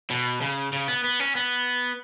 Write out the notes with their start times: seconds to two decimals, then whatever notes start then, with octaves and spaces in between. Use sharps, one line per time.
0.10 B2
0.41 C#3
0.72 C#3
0.88 B3
1.04 B3
1.20 C#4
1.35 B3